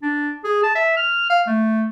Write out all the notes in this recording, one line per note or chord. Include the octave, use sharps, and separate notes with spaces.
D4
G#4
A5
E5
F6
F5
A3